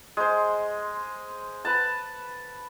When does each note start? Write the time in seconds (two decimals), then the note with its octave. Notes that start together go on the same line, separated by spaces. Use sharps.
0.17 G#3 C5
1.65 B4 F#5 A5